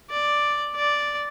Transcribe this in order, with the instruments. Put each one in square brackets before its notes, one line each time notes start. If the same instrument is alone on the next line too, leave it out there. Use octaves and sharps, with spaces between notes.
[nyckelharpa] D5
D5